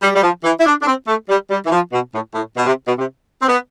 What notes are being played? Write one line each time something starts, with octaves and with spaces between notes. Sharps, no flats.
G3
G3
F3
E3
E4
D4
D4
C4
A3
G3
G3
E3
F3
B2
A2
A2
B2
C3
B2
C3
C4
B3